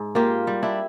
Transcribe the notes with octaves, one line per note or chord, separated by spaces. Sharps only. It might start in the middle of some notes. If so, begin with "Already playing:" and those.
Already playing: G#2
A#3 F4 G4
G3
D4 E4